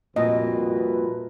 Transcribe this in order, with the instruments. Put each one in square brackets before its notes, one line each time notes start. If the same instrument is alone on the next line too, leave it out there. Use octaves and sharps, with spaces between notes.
[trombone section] C2 F#4 B4 [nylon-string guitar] F2 A#2 [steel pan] D#5